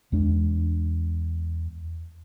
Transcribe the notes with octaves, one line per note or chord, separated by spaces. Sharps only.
E2 G#3 D4